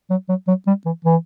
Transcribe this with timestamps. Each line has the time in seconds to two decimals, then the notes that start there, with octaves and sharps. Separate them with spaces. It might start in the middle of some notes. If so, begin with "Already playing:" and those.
0.10 F#3
0.29 F#3
0.48 F#3
0.67 G3
0.86 E3
1.05 E3